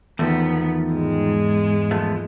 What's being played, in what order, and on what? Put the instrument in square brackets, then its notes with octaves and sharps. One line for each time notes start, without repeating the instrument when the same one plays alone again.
[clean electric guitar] E2 [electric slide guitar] D#3 F3 A3 [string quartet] B3
[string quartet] G#2 G#3
[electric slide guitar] F3 A3 B3